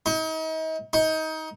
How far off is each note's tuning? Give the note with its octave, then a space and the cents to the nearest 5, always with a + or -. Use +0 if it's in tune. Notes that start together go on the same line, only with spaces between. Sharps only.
D#4 +40
D#4 +25